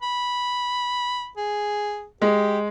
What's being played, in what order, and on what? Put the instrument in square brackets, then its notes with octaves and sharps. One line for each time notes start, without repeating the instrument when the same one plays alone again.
[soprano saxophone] B5
G#4
[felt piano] G#3 [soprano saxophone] G4